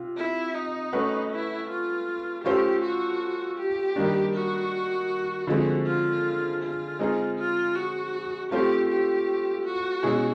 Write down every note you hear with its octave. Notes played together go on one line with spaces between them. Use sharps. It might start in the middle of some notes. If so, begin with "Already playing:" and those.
Already playing: C3 F4
E4
D#4
A3 C#4 F#4 B4
E4
F4
A3 C#4 F4 G4 A4 C5
F#4
G4
D#3 G3 A#3 D4
F#4
D3 F3 G#3 C4
F4
F4
G#3 C4 D#4 G#4
F4
F#4
A3 C4 F4 G4 A4 C5
G4
F#4
B2 G#3 C#4 E4 G#4